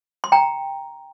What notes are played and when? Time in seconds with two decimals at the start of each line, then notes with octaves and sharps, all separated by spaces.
0.24 C6
0.32 G5 A#5